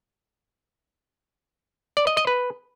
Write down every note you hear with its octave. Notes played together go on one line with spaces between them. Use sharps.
D5
D#5
D#5
B4